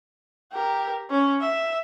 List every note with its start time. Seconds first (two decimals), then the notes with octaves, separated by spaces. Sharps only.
0.52 G4 A#4
1.10 C#4
1.41 E5